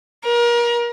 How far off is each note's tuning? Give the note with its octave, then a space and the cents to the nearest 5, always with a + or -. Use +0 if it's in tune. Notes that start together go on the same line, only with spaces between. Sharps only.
A#4 +30